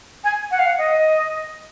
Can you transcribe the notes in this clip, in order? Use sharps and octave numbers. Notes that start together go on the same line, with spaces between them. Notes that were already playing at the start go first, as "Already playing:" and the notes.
G#5
F#5
F5
F#5
D#5